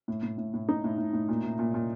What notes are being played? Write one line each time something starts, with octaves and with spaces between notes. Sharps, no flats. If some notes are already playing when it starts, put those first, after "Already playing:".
A2
A2
A2
A2
A2 D#4
A2
A2
A2
A#2
A#2
A#2
A#2